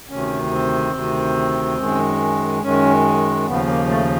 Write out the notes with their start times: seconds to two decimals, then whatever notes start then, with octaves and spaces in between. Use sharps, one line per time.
0.09 D2 C3 D#3 C#4
0.51 C4
0.93 D2 C3 D#3
1.78 F#2 D#3 G#3
2.63 F#2 D#3 G#3 C#4
3.47 D#2 C#3 F3 B3
3.67 A#3
3.88 A3